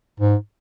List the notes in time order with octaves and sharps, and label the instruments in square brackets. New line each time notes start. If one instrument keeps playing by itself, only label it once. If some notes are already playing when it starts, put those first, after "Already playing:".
[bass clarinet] G#2